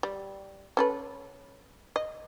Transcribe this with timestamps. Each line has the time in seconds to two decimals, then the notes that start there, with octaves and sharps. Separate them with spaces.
0.03 G3
0.77 C#4 A4 B4
1.96 D#5